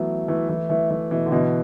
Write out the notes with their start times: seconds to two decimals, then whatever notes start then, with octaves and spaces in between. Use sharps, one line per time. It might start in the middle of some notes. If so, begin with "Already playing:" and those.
Already playing: E3 F#3 A3 B3
0.28 E3 A3
0.49 E3 A3
0.69 E3 A3
0.90 E3 A3
1.11 B2 E3
1.26 D3
1.32 B2 E3